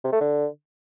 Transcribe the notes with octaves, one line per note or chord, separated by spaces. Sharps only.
C3
A3
D3